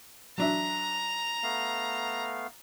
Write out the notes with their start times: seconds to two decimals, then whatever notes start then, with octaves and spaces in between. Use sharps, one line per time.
0.38 F#3 D4 E5 A#5
1.43 A3 B3 F5